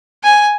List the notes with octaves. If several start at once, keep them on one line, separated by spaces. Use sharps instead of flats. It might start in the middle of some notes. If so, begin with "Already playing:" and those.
G#5